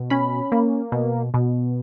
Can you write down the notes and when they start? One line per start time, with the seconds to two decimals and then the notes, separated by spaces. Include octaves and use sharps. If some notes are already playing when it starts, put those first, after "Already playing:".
Already playing: B2
0.10 C#4 B5
0.52 A#3
0.92 B2
1.34 B2